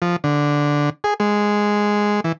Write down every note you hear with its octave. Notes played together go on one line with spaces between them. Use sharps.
F3
D3
G#4
G#3
E3